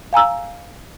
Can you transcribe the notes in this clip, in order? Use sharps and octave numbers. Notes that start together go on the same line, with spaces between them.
F5 G#5 A#5 E6